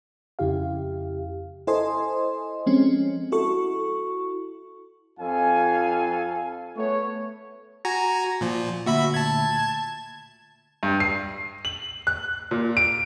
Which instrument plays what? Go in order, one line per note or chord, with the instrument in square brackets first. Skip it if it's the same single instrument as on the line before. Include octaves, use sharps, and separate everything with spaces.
[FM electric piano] F2 C#3 E4 G4 F5
E4 A4 C5 D#5 G#5 C6
F3 G#3 C4 C#4
E4 F#4 A4 C#6
[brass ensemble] F2 F4 A4 F5 G#5
A3 B3 C#5
[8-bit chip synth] F#4 G#5 A#5
A#2 F3
[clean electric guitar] D2 A#2 [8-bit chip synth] F#4 E5 B5
[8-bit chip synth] A5 G#6
[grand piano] G2
C7
F#7
F#6
A#2
D7